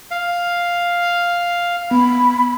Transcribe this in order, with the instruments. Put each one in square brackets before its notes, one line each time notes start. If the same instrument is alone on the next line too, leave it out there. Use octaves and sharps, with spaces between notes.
[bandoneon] F5
[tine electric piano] B3 [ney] B5